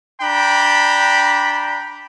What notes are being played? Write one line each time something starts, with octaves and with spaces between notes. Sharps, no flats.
D4 G5 A#5 B5